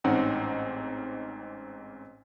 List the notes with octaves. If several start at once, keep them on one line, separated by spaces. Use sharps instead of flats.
A1 G#2 C4 C#4 D#4 F#5